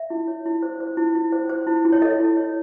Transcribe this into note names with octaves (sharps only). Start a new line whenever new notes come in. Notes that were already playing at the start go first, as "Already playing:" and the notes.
Already playing: E5
E4
C#5
E4
C5
C5
E4
E4
C5
C5
E4
E4
C#5
A4 D#5
E4
C#5